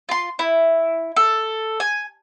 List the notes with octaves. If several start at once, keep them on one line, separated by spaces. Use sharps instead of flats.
F4 C6
E4
A4
G#5